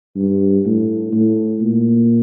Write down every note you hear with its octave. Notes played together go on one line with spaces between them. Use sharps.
G2
A2
A2
A#2